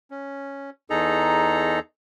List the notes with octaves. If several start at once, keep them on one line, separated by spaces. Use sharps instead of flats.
C#4
E2 D#4 G#4 A4 A#5